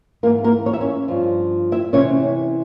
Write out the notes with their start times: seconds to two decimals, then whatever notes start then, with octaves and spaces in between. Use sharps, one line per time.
0.23 G#2 E3 A#3 A#4
0.44 A#3 A#4
0.66 C#5
0.73 E5
0.81 C#4 C#5
1.08 G2 F3
1.72 E4 E5
1.93 C3 E3 C#4 C#5